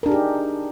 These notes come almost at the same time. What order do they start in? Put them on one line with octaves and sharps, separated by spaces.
A#4 D4 G#4 G4 D#4